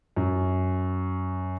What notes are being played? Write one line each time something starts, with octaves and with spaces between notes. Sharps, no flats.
F#2